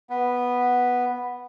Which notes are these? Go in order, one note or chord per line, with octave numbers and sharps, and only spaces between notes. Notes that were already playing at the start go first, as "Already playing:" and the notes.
B3